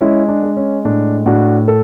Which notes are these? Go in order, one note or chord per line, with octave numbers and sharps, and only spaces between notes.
G#3 C#4 E4
D4
G#3
C#4
A2 D4
A2 D4 F#4
A4